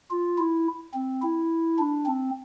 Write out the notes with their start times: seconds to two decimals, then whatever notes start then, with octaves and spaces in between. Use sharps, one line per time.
0.11 F4
0.38 E4
0.94 C4
1.22 E4
1.79 D4
2.06 C4